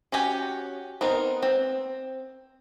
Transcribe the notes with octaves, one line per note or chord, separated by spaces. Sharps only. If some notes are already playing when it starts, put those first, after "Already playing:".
C#4 F#4 G4 G#5
B3 C4 D#4 A#4
C4